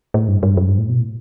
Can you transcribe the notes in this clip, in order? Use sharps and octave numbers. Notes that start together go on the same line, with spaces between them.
A2
G2
G2
F#2
G2
A2
B2
A2